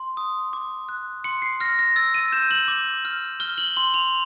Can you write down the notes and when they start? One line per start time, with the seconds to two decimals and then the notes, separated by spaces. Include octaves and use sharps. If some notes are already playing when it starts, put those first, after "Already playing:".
Already playing: C6
0.17 D#6
0.53 D6
0.89 F#6
1.24 C6 C#7
1.42 C7
1.61 F6 A#6
1.79 A#6
1.96 E6 A6
2.14 D#7
2.32 G6 E7
2.51 F#7
2.68 D6
3.05 F6
3.40 F6 G7
3.58 F#7
3.77 C6 F#7
3.94 F7